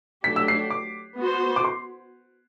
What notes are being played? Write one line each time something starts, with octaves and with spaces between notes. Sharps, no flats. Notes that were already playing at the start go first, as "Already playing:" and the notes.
F#3 A3 D4 G4 B6
E6
C7
D6
B3 F#4 C5
D6
C6